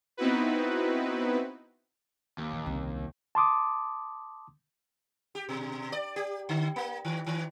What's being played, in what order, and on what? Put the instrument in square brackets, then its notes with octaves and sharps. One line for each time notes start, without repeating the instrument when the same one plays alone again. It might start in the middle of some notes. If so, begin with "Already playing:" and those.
[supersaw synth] B3 C4 D#4 E4 F#4 B4
[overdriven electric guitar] D#2
[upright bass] A#2 E3
C2 C#3
[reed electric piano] A5 C6 D6 D#6
[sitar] G4
B2
D5
G4
D3
A#3
D#3
D#3